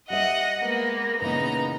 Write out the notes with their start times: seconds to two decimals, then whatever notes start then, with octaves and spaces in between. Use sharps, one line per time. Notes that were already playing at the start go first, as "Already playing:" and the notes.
0.10 G3 D#5 E5 F#5 D#6 A#6
0.62 G#3 A#3 B3
1.22 A#2 C#3 E3 A#3 B3 D#4 A#5